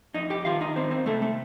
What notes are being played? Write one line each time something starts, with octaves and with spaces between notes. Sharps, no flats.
F2 D#4 D#5
G4 G5
D#3 F4 F5
D#4 D#5
C4 D#4 C5
C4 C5
C3 A3 A4
A3 A4